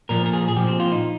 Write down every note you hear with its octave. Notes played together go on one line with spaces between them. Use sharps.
A#2 F3 A#4
A#4
G#4
G#4
A#2 F3 G4
C4
F4
D#4